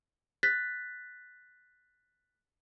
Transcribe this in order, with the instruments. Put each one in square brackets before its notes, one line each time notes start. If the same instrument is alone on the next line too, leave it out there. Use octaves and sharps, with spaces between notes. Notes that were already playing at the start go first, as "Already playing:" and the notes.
[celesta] F#6 A6 B6